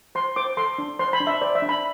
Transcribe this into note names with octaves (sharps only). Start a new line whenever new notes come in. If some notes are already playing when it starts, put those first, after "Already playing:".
C5 C6
C5 D6
A4 C6
D4
C5 C6
B5
D4
E5
C5 D5
E5
D4
B5